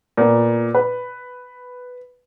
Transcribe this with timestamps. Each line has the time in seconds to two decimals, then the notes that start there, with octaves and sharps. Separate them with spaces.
0.17 A#2 B3
0.75 B4